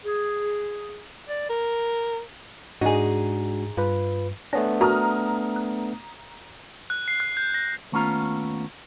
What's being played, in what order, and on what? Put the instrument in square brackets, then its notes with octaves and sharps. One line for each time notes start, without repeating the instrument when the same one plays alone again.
[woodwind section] G#4
[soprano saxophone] D5
A#4
[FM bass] G#2 [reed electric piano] G#3 D4 F#4 [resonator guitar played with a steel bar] D#4 G#4
[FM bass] G2 [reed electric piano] F4 B4
[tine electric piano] A3 B3 D4 [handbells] C#5 G#5 A#6
[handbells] F#4 A#4 A5 [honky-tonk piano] A#5 D#6 F6
[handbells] F#6
[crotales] F#6
C7
F#6
G6
A#6
[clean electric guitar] D#2 A3 B3 C#4 F4 A#5